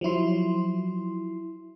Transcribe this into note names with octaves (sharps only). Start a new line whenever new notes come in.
F3 F#3 E4 C6